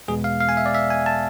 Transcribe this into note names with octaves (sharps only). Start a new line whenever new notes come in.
E2 B2 G#3 B3 G#4
F5
F5
G#5
E5
D5
E5
G#5
A5